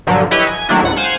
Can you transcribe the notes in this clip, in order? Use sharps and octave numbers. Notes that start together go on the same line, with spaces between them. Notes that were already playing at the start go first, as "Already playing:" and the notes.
G2 A#2 D3 F3 F#3
E4 G4 B4 C#5 D#5
G#5
D#3 F#3 A3 A#3 D4 E4
C#2 G#2 F#5
C5 F5 F#5 G#5